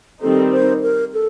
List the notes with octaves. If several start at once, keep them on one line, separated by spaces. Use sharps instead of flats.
D#3 G3 C4 D#4 A4
C5
A#4
A4